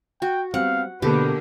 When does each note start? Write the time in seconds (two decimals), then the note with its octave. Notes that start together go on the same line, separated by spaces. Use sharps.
0.22 F#4 G5
0.54 G3 B3 C4 F5 F#5
1.02 B2 D3 A#3 G4 A4 B4